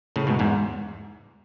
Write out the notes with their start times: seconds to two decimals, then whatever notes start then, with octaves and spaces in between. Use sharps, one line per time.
0.16 A2 C#3
0.27 G#2 B2
0.39 E2 G#2